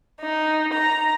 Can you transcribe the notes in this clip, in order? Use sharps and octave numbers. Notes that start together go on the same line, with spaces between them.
D#4
A#5